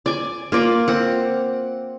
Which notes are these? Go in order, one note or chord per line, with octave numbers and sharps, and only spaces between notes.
D5 G#5
A#3 F4 D5
C4 F#5